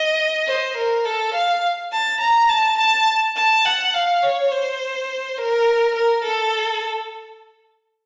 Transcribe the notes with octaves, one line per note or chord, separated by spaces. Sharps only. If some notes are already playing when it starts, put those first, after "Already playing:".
Already playing: D#5
C5
A#4
A4
F5
A5
A#5
A5
A5
A5
F#5
F5
C#5
C5
A#4
A#4
A4